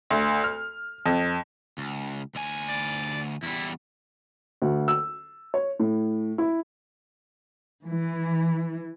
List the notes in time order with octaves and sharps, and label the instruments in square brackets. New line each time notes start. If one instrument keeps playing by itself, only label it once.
[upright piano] D2
F6
F2
[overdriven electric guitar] C#2
D2 G#5
[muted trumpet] D5
[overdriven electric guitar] E2 G3 [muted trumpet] E4
[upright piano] D2
E6
C#5
A2
E4
[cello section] E3